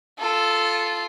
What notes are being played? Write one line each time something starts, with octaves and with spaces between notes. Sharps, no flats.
F4 A4